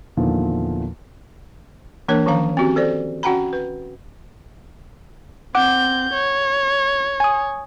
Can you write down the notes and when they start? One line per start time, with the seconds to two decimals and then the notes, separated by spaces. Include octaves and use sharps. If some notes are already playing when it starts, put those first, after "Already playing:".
0.17 E2 A#2 D3 D#3 F3
2.08 E3 A#3 D4 A#4 C#5
2.26 D#3 F3 C#4 C#5 F5 A#5
2.57 C4 C#4 F#4 G4
2.76 A4 C5 D5
3.23 C#4 F#4 F#5 G5 A#5 B5
3.53 B4
5.55 C4 F#5 D6 G6
6.13 C#5
7.20 G#5 D#6